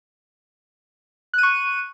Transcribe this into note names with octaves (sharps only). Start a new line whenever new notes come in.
C#6 F#6 D#7